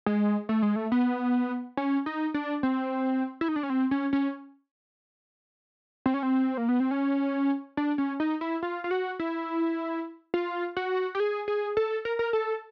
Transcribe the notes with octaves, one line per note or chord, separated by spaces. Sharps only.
G#3
A3
G#3
A3
B3
C#4
D#4
D4
C4
E4
D#4
D4
C#4
C4
C#4
C#4
C4
C#4
C4
A#3
B3
C4
C#4
D4
C#4
D#4
E4
F4
F4
F#4
E4
F4
F#4
G4
G#4
G#4
A4
A#4
A#4
A4